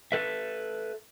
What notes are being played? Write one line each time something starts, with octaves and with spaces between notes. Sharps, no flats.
A4 B4 E5